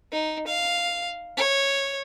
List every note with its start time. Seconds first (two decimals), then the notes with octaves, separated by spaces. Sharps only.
0.12 D#4
0.47 F5
1.37 C#5